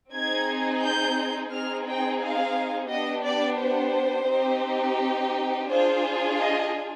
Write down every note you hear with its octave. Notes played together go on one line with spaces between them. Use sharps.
C4 D#4 G#4 G#6
G6
C4 D#4 G#4 F6
G5
F5
B3 D4 G4 D#5
D5
C5
C4 D#4 G4
D4 F4 G#4 C5
D#5